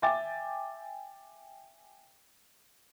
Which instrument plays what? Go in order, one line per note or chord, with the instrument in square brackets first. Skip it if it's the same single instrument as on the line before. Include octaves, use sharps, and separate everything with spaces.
[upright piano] E5 G5 G#5 D6 A6